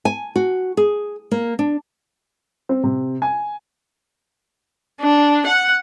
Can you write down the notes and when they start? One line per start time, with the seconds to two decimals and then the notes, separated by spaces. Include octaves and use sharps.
0.05 G#5
0.36 F#4
0.77 G#4
1.31 A#3
1.59 D4
2.69 C4
2.84 C3
3.22 G#5
5.01 D4
5.46 F#5